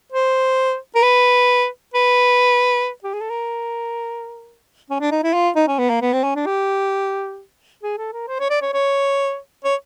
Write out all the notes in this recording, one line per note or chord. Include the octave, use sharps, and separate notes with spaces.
C5
A#4
B4
B4
G4
G#4
A4
A#4
C#4
D4
D#4
E4
F4
D#4
C#4
B3
A#3
B3
C4
C#4
D4
G4
G#4
A4
A#4
C5
C#5
D5
C#5
C#5
C#5